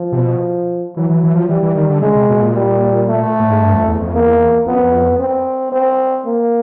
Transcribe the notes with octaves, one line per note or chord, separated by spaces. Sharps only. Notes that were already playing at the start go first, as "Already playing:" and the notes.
Already playing: F3
C3
B2
E3 F#3
E3
E3
F3
E3 G3
E3
D#3
D3
C#3 G#3
C3
B2
A#2
G3
A3
A2
G#2
G2
F2
E2
F2
E2 A#3
F2 B3
F#2
F2
C4
C4
A#3